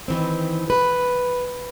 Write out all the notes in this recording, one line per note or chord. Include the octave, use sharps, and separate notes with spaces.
D#3 E3 C4
B4